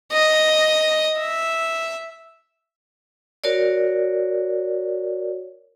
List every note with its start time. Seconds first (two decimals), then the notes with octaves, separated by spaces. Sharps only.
0.12 D#5
1.19 E5
3.44 F#4 A#4 C#5 D5